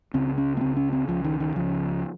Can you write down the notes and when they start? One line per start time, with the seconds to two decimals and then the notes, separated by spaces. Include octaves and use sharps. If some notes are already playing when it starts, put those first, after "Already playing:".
0.14 C#2 C#3 C4
0.38 C#4
0.57 A#3
0.61 C#2 C#3 C4
0.77 C#4
0.92 C4
1.08 C#2 C#3 F3
1.24 D#3
1.40 D#3
1.56 C#2 C#3 F3